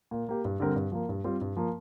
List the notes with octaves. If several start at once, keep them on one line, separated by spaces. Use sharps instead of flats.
A#2
A#3 G4
G2
D3 G3 C4 A#4
G2
F3 A#3
G2
G3 C4 F4
G2
F3 A#3